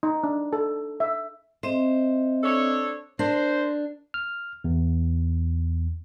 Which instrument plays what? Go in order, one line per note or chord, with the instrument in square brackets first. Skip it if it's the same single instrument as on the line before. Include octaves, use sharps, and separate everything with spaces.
[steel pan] D#4
D4
A4
E5
[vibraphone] C4 D#5 E5 [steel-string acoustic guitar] C5
[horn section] D4 A4 C#5
[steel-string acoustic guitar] D4 [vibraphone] A#4 [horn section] C5
[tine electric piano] F6
E2